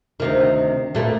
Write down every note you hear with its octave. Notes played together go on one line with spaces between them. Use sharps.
D2 C3 D#3
A#2 A3 B3